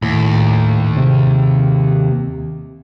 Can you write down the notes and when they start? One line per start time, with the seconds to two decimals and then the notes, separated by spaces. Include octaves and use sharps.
0.02 D#2 A2
0.97 C3